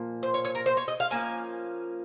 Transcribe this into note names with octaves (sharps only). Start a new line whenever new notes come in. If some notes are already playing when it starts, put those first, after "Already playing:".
Already playing: A#2 F3 A#3
C5
C#5
C#5
A#4
C5
C#5
D#5
F5
F3 A#3 C#4 G#5